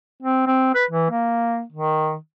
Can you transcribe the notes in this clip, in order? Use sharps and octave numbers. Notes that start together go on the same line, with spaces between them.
C4
C4
B4
E3
A#3
D#3